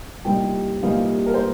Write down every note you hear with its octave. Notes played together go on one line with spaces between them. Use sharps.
C2 A#2 G3 C4 D#4 G5
C2 A#2 G3 C4 D#4 F5
A#4
C5